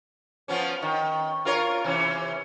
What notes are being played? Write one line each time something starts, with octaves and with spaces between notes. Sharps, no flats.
F3 B3 C#4
D#3
F4 A#4 C#5
C3 E3 C#4